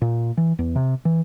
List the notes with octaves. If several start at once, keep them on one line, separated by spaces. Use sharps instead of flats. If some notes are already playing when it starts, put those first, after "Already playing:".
A#2
E3
E2
C3
E3